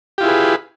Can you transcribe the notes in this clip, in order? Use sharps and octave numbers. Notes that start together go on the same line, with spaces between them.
E4 F4 G4 G#4 B4